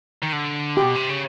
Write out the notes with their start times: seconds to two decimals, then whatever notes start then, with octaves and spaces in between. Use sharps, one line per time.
0.22 D#3
0.32 D3
0.77 B2 G4
0.95 C3
1.09 C#3